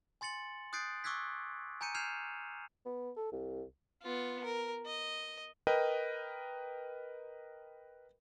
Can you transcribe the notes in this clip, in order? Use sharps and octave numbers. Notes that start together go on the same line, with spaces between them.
G#5 C6 A6 C#7 F#7
D#6 F#6 G6 A6 C7 D7
C#6 D6 E6 F#6 G#6 B6
G#5 A#5 G6 C#7 D#7
F6 G6 G#6 C7 E7 F7
B3
A4
C2
B3 F4
A#4
D#5
A#4 B4 D#5 G5